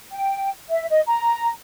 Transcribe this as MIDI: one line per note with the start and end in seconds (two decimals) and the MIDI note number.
0.12 0.50 79
0.68 0.84 76
0.89 1.00 75
1.06 1.48 82